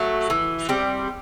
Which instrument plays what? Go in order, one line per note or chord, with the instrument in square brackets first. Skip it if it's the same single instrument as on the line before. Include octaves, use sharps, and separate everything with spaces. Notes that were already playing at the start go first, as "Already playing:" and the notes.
Already playing: [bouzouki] F#3 A3
E3
G3 C4